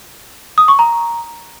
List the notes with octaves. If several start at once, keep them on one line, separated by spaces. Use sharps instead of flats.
D#6
C#6
A#5